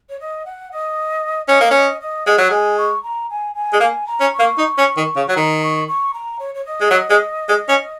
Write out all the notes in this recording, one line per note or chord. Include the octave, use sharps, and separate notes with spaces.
C#5
D#5
F#5
D#5
C#4 D#5
A#3
C#4 D#5
D#5
G#3 F#5
F#3
G#3 G#5
C#6
A#5
G#5
G#5
G#3
A#3 G#5
A#5
C#4
C#6
A#3
D#4
C#4
D#3
C#3
F#3
D#3 A#5
C#6
C#6
A#5
C#5
C#5
D#5
G#3
F#3
G#3
G#3
C#4